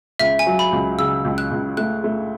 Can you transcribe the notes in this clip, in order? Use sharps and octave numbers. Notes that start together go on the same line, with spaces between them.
C#2 E5
G#5
F#3
B5
C#2
C#3 E6
C#2
F#6
C#2
A3 F#6
A3